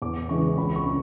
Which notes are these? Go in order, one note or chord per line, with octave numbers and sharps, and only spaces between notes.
E2 D6
C#3 E3 G#3 C#6
C#2 B5
C#6
C#3